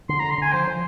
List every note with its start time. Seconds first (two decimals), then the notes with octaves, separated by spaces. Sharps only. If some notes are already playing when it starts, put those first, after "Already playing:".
0.09 D3 C6
0.20 A#5
0.24 D3
0.30 C6
0.38 D3 G#5
0.53 F3 C5
0.67 F3